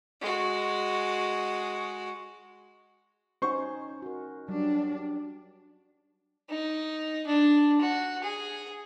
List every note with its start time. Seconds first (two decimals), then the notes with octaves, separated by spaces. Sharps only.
0.21 G#3 F#4
3.42 C#4 D#4 C5 C#6
4.02 F#4 A#4
4.48 F#3 G3 D4
6.49 D#4
7.27 D4
7.81 F#4
8.23 G#4